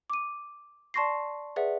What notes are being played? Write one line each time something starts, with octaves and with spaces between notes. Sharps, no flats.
D6 D#7
D5 A5 C6 C#6 A#6 C7
G#4 B4 D5 E5 F#5